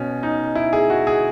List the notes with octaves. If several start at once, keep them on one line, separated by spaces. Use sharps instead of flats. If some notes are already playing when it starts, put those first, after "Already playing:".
Already playing: B2 C#4
D#4
E4
G#4
F#4
G#4